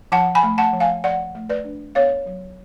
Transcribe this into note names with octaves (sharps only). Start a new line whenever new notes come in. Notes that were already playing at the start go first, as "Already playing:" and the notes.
F3 F#5 A5
G#5 B5
A3
F#5 A5
F3
F5 G#5
F3 D5 F#5
A3
B4 D5
D4
B3 C#5 F5
F#3